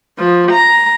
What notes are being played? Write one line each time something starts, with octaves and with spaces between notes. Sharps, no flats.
F3
A#5